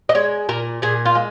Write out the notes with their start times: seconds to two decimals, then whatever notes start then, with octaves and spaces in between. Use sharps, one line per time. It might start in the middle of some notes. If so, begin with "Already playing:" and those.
0.09 D#5
0.15 G#3 C#5
0.49 A#2 A#4
0.82 A#2 G#4
1.05 F4
1.15 G#3